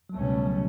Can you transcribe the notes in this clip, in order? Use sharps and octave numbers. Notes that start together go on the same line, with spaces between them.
F#3
C#2 B2 G3 A3 C#4
G3
F#3